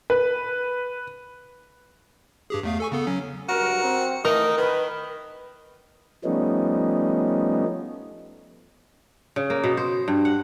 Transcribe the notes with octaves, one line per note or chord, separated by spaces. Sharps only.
B4
G2 G4 G#4
E2 A3 F5
A4 G#5 C#6
C#3 B3 A4
F#3 C#4
G2 F#3 F#4 A#4
C4
E3 A3 D#4 A#4
D#3 B4
F3 G3 A3 B3 C#4 D#4
C#3
A#3
B2
C5
G2
F#5